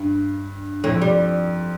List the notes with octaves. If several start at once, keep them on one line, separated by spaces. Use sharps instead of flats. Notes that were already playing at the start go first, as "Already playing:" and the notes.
Already playing: G2
F2 A2
G3